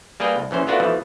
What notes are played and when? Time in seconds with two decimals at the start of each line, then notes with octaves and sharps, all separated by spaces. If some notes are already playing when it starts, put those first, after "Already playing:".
0.20 G3 A#3 G#4 A#4 B4 G5
0.36 C2
0.51 A#1 E3 C#4 C5
0.67 A3 B3 D4 F4 F#4 A#4
0.80 B2 E3 F3 A3